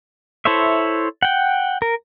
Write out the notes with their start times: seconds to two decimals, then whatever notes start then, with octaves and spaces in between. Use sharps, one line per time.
0.45 E4 A4 C5 C#5 E5
1.23 F#5 G5
1.82 A#4